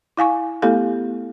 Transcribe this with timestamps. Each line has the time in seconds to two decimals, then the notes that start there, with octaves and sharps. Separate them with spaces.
0.17 E4 F5 G#5 C#6
0.62 A3 B3 E4 G4 A4 F5